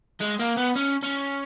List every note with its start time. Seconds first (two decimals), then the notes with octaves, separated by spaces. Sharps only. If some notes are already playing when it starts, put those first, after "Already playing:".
0.20 G#3
0.39 A#3
0.57 B3
0.76 C#4
1.03 C#4